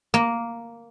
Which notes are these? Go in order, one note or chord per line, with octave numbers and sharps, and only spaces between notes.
A#3